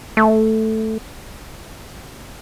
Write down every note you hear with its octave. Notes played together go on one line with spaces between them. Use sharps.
A3